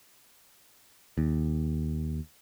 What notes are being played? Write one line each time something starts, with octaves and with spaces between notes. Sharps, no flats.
D#2